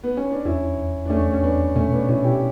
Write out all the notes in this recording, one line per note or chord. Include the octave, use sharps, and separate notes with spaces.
B3
C#4
D4
E2 C#4 E4
E2
D4
E2 A3 C#4
C#4
E2 B3 D4
B2 A3 C#4
B3 D4
B2 C#4 E4
E4 G4